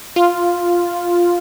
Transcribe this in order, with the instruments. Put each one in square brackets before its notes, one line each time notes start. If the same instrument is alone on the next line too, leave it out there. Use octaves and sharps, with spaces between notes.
[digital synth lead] F4